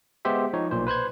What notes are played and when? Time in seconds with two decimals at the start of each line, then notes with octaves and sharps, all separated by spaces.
0.25 G#3 B3 G4 C5 E5
0.54 F3 D#4 C#5
0.71 B1 A#2 C5
0.87 B4 C5 F#6 G#6